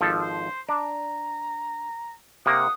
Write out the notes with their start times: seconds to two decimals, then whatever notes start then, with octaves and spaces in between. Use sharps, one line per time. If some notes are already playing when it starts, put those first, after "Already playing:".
0.01 G#1 F3 G4 A4
0.20 C5
0.69 D4 A#5
2.46 C3 A#3 F#5 D#6